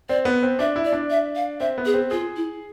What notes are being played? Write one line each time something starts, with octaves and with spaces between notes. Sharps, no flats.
C4 D5
B3
C4
D4 E5
E4
D5
D4
E5
F5
C4 E5
B3
G#4
C4
F4 G#4
E4